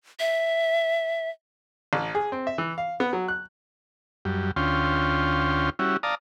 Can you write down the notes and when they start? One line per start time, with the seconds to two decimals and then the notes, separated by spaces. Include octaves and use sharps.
0.20 E5
1.93 A1
2.15 G#4
2.32 C4
2.47 E5
2.58 E3
2.78 F5
3.00 B3
3.13 F#3
3.28 F#6
4.25 F#2 G3
4.56 D2 C#4 F4 G5 C6
5.79 G3 C#4 E4 F#4
6.03 D5 F5 A5 A#5 D#6